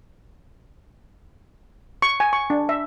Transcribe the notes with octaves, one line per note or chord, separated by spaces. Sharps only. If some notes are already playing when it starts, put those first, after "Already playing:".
C#6
G#5
C#6
D4
E5